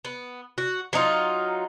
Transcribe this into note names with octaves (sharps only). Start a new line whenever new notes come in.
B3
F#4
F#3 D4 D#4 F4